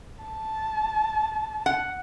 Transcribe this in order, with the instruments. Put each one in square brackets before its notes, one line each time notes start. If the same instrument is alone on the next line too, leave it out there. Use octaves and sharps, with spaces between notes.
[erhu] A5
[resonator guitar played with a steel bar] F#5